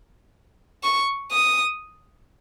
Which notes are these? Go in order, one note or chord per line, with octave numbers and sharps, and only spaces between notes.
C#6
D#6